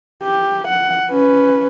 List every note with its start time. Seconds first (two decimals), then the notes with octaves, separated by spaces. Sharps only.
0.23 G4
0.68 F#5
1.10 C#4 B4